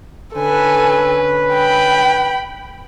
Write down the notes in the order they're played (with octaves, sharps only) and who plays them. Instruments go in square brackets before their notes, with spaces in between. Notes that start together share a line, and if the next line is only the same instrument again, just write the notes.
[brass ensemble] D3 C#4 B4 [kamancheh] A4 G#5
[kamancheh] G5 B5